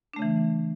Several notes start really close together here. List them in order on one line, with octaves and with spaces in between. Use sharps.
D4 A3 C#3 E3